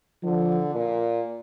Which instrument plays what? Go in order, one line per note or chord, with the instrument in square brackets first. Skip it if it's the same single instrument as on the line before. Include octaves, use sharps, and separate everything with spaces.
[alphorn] D3 [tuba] F3
[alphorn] A#2